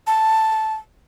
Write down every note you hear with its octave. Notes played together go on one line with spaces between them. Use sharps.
A5